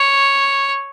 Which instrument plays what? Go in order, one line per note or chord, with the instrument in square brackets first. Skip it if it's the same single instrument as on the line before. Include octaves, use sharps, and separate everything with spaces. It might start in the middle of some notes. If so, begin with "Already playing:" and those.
Already playing: [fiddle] C#5